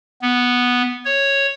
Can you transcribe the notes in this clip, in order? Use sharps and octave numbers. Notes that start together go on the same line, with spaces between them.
B3
C#5